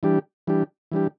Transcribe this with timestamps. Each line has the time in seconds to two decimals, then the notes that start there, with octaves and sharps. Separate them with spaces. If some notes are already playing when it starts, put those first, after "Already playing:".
0.03 E3 G3 D4 G4
0.47 E3 G3 D4 G4
0.92 E3 G3 D4 G4